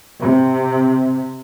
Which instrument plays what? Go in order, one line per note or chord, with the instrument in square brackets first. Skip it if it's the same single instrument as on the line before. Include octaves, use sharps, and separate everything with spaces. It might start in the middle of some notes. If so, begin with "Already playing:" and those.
[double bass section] C3